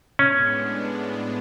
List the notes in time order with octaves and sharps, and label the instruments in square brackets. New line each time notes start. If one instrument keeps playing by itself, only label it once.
[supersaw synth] A2 G#3 B3 D4 [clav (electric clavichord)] C#4